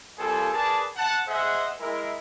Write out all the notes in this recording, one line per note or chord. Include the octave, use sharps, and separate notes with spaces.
G3 A#3 C4 F4 G#4 A4
G#4 A#4 B4 D5 A5
F#5 A5
G#4 C5 D#5 E5 F#5
G#3 E4 A#4